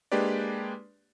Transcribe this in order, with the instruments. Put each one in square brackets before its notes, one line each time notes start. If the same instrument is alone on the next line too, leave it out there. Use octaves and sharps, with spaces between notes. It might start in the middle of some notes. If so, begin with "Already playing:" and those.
[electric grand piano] G#3 A#3 D4 G4 B4 D5